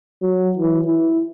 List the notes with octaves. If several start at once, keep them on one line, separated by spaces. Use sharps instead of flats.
F#3
E3
E4